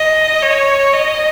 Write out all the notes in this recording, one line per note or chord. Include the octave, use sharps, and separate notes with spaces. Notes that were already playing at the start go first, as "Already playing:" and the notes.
Already playing: D#5
C#5
D#5